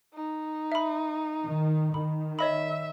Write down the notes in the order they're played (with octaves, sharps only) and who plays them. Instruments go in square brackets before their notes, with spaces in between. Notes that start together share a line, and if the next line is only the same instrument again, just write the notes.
[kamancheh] D#4
[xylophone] E5 B5
[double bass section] D#3
[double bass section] D#3 [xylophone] B5
[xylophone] C#5 D#5 B5 [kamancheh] E5